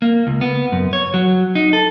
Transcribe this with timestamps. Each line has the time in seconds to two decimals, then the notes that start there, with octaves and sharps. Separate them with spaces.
0.02 A#3
0.27 C#2
0.41 B3
0.72 F#2
0.93 C#5
1.14 F#3
1.55 D#4
1.73 A4